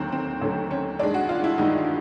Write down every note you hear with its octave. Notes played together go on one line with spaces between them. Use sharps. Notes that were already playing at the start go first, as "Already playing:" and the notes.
Already playing: D#2 D3 F#3 A3 C4
C4
D#2 D3 F#3 A3 C#4
C#4
G2 D#3 G#3 D4
F#4
F4
E4
G2 D#3 G#3 D#4